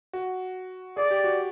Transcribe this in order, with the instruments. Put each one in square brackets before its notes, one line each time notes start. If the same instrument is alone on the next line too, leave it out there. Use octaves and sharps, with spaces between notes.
[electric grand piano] F#4
[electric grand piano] G#4 [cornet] D5
[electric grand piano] G4
F#4